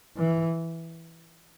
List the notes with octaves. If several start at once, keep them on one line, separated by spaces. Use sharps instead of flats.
E3